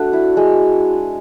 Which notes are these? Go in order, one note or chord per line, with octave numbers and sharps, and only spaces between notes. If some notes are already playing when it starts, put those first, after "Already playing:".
Already playing: A3 D4 F#4
E4
G#3